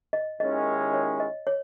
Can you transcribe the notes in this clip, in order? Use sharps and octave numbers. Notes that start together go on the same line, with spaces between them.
D#5
D#2 D#3 G#3 C#4 E4 D#5
C#5
D#5
C#5